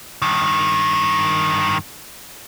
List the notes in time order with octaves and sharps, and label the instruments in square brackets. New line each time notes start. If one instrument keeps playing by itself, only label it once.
[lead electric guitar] G2 D#3